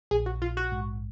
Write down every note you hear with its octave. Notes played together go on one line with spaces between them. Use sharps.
A#1 G#4
F#4
A#1 F4
F#4
G#2